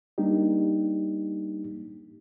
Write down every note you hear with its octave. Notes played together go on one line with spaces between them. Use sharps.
G3 A#3 D4 D#4 G4